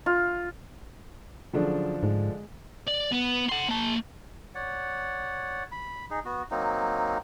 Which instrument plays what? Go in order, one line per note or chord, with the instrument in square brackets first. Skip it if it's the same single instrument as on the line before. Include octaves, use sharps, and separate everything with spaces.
[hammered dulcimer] F4
[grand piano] D3 F3 D4 [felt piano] F#3 C#4 G#4
[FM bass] G#2 [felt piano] G#3
[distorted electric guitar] D5
B3
F#5 C6
A#3 A5
[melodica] C#5 D5 F#5
B5
D#4 G#4
B3 F#4
F#3 A#3 C4 D#4